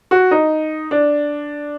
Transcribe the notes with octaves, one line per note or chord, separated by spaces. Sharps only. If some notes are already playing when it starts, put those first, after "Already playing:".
F#4
D#4
D4